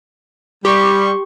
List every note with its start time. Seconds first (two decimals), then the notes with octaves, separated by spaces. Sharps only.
0.65 G3 G4 C6 C#6